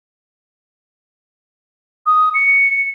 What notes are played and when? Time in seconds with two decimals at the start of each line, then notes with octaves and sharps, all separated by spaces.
2.06 D#6
2.34 C#7